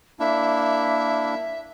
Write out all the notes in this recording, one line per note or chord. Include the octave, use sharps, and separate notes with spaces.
A#3 D4 E4 E5